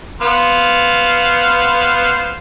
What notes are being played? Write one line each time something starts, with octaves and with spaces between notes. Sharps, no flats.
B3 C5 F5